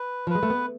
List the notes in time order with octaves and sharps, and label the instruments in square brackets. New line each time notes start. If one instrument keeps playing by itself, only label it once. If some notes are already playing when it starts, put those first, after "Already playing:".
Already playing: [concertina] B4
[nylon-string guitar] F3
[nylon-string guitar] G#3 [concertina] B4
[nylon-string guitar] A3
B3